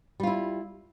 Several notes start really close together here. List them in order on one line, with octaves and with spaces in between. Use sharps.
G3 F4 E4